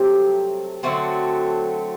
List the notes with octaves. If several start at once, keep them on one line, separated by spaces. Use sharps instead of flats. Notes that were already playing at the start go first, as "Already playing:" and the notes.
Already playing: C3 F#3 G3 A3 C4 G4
D3 F#3 A3 C4 F#4